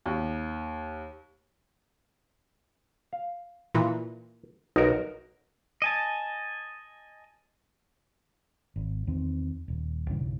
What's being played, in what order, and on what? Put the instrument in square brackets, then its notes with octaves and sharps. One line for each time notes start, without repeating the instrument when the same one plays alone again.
[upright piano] D#2
[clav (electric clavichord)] F5
[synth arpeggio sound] A#2 E3
[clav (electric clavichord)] B1 F#4 A#4 [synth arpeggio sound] D#4
[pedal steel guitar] D#5 G#5 A5
[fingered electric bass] G#1
E2 D#3 C4
D#1
B1 G2 C#3 E3